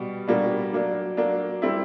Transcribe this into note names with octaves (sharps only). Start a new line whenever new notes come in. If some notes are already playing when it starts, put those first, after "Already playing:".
Already playing: B2 G3
B2 G3 A#3 D4
F#3 A#3 D4
F#3 A#3 D4
G3 C4 E4